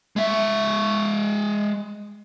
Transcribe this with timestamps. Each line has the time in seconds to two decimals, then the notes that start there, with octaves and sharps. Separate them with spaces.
0.16 G#3 E5